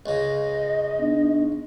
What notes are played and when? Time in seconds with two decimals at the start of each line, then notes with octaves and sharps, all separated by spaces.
0.06 C#2 C#3 D#5
0.98 B3 D4 D#4